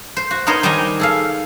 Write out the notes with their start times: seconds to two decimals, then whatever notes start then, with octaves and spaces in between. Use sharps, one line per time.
0.17 C5
0.31 F#4
0.47 B3 D#4 A#4 C5 C#5 D#5
0.63 D#3 G3 D#4 G5 G#5 A#5
0.99 G#4 A4 F5